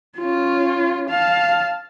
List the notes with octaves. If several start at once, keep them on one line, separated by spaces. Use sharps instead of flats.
C#4 F4
F5 A5